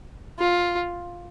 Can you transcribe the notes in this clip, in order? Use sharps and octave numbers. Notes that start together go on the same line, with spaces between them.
F4